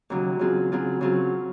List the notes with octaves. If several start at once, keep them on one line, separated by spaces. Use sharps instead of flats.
D#2 C#3 F#3
C#3 F#3 C4 F4 G#4
C#3 F#3 C4 F4 G#4
C#3 F#3 C4 F4 G#4